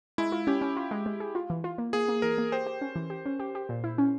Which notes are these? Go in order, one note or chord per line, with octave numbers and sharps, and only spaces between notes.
G#3 E4
F4
C#4 G4
C#4
F4
G#3
G#3
G#4
F4
E3
F4
A#3
A#3 G#4
A#3
E3 A#4
A#3
G4 C5
G4
C#4
E3
G4
C#4
G4
G4
A#2
E4
C#4